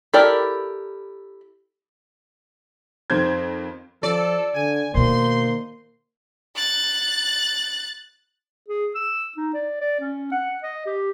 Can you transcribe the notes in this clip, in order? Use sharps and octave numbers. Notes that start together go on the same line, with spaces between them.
E4 G4 A4 A#4 D5
F2 D#3 C4 C5 G6 G#6
F3 A4 D5
D3 G#5
B2 D#3 A#3 D#4 C5 C6
F#6 A6
G#4
E6
D#4
D5
D5
C#4
F#5
D#5
G4